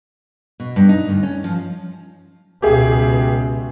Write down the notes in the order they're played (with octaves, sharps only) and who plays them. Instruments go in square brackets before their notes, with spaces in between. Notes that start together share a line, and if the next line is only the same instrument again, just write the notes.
[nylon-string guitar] B2
G2
D#4
D2
C#4
F3
[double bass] C#2 B2 [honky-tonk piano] G4 G#4 E5